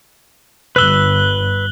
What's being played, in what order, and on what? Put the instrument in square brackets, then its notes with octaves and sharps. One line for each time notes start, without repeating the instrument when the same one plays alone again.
[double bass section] G1 [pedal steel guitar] B4 E6 [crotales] F#6 F#7 G7